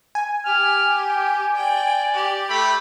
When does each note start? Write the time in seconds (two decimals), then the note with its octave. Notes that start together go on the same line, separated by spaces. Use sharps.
0.15 G#5
0.46 G4 F6
1.08 G5
1.56 D5 G5
2.13 G4
2.48 A3 G5 B5